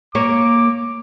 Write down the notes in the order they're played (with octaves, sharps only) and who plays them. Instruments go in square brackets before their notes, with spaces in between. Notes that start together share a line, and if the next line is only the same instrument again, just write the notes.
[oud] A#3 C#5 [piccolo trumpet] D6